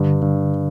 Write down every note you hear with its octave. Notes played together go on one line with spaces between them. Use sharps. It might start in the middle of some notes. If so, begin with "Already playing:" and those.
Already playing: G2 D3
G2